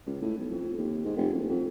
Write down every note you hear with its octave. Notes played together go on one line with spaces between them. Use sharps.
C#2
A2
B1
F2
D#2
G#2
F1
F#1
F2